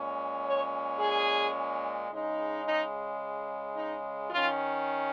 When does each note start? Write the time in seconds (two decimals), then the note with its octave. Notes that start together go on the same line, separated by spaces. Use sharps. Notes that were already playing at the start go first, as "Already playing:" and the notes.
Already playing: A#2 G#3 C#4
0.45 C#5
0.99 G#4
2.10 C#3 G#3 D#4
2.65 D#4
3.76 D#4
4.31 D#3 C#4 F4